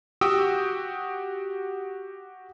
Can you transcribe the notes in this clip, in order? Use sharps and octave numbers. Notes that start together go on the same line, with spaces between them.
F#4 G4 G5 D#6 E6